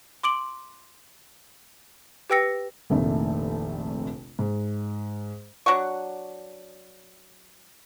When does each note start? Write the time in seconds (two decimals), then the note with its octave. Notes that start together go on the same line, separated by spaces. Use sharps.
0.23 C6 D6 D7 F#7
2.30 G4 B4 G5 E6 A#6 C#7
2.90 F1 A#1 C3 D#3 A3
4.39 G#2
5.66 F#3 D4 F#5 C#6